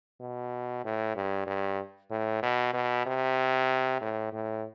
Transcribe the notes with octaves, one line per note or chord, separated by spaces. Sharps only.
B2
A2
G2
G2
A2
B2
B2
C3
A2
A2